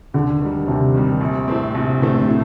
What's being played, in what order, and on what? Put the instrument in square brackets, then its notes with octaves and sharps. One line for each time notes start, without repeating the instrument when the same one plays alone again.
[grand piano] D#2 [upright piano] D3
[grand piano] D#3 G3
[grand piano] D#2 [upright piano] C3
[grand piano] D#3 G3
A#1
A2 A3 C4
[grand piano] A#1 [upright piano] C3
[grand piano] A2 A3 C4 [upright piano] D3
[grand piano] A2 [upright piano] C3